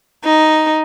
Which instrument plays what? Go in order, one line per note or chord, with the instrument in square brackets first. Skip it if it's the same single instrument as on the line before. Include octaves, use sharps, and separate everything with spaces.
[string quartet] D#4